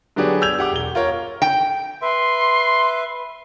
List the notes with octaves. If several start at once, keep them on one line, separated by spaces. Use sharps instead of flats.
D3 F#3 B3 D4 G4 G#4
E6 G6 G#6 F7
G4 F#5 D6
E1 G7
F4 A#4 C#5
G5
B4 E5 C6